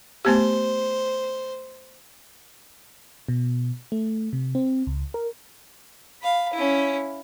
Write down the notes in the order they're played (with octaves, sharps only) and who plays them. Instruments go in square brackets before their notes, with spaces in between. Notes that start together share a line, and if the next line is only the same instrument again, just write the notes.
[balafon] A3 B3 G4 [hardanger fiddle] C5
[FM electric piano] B2
A3
C3
C4
C#2
A#4
[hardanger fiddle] F5 B5
C#4 E4